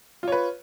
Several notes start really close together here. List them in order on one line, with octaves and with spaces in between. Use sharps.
F4 C#5 B4